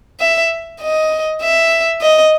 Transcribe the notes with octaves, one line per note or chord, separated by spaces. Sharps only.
E5
D#5
E5
D#5